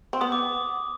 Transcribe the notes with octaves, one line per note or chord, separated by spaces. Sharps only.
C4
B3 D#6
D6